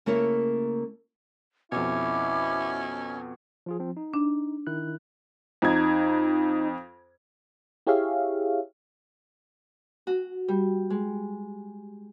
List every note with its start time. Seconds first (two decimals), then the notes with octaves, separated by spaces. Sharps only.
0.06 C#3 A3 A#3 E4 A#4 C#5
1.72 F2 B2 C#4 E4 D6
3.66 F3 F4 G#4
3.80 F3 C4
3.97 D#4
4.14 D4
4.67 D#3 E4 F#6
5.62 F2 D#4 G#6
7.87 E4 G4 G#4 C#5 E5 F5
10.07 F#4
10.48 G3
10.90 G#3